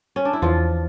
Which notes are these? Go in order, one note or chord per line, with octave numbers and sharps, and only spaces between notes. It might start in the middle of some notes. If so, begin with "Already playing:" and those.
C#4
D4
E4
E2 F3 F4